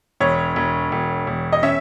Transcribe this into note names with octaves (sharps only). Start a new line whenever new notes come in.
E1 C#5
E1
E1
E1
D#5
C#4 E5